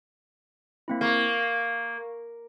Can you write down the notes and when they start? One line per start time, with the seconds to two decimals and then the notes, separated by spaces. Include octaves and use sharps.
0.88 A#3 C4 E4
1.01 A#3 F5 C#6